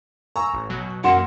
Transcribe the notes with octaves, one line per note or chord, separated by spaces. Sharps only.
G#5 A#5 C#6 E6
A1
B2 F#3
F#2 E3 A#3 F#5 C6 E7